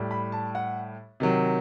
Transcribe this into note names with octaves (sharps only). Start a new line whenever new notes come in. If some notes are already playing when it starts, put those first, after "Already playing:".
Already playing: A2 G3
B5
A5
F#5
C3 D#3 F#3